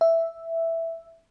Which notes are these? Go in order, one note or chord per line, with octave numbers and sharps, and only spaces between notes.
E5